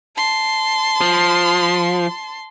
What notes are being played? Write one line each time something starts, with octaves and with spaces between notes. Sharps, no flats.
A5 C6
F3